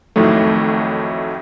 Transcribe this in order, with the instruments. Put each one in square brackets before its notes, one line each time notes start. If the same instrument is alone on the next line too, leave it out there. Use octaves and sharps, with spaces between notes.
[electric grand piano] F2 A2 D#3 F#3 A3